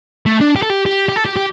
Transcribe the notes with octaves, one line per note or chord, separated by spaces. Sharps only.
A3
D4
G4
A4
G4
G4
G4
A4
G4
G4